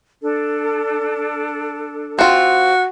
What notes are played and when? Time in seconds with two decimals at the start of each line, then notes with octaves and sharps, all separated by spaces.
0.22 D4 A4
2.19 C4 F4 F#4